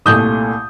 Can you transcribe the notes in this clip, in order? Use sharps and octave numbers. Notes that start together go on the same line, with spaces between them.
C2 A#2 A3 D#6 G6